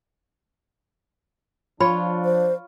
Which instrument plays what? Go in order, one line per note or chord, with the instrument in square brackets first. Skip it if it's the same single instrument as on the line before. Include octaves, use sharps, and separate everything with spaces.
[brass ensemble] F3 D4 [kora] F4 C#5 [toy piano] B5
[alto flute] C5